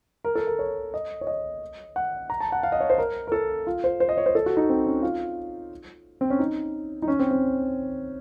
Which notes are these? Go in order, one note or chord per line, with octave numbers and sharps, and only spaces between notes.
A#4
A4
A#4
C#5
D#5
C#5
D#5
F#5
A#5
A5
F#5
F5
D#5
C#5
C5
A#4
A#4
A4
F4
C5
C5
D#5
C#5
C5
A4
F#4
D#4
C4
C#4
F4
C4
C#4
D#4
D#4
C#4
C4
C4